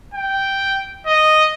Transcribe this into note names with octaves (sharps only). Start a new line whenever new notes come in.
G5
D#5